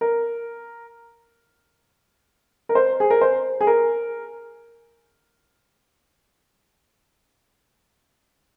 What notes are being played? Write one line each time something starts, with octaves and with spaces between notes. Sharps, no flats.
A#4
A#4
C5
G#4
A#4
C5
G#4
A#4